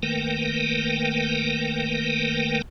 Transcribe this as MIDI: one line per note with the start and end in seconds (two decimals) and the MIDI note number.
0.03 2.62 51
0.03 2.62 57
0.03 2.62 58
0.03 2.62 70
0.03 2.62 71
0.03 2.62 79